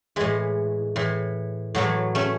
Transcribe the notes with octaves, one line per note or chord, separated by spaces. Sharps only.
A2 E3 G#3
A2 E3
A2 E3 F#3 A3
A3 C#4